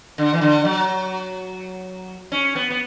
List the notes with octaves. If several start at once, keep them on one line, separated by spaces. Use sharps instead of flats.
D3
E3
D3
F#3
C#4
B3
B3